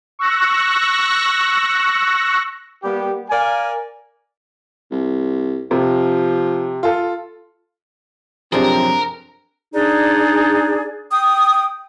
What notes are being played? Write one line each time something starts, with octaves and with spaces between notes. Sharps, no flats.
C#6 E6 F#6 A#6
G3 A#3 B3 G4
A#4 D5 F5 G#5
C2
C3 F3
F4 A4
F#2 C3 F3 C4 D4 G4 G#4 A#4
D4 D#4 G#4 D5
G5 D#6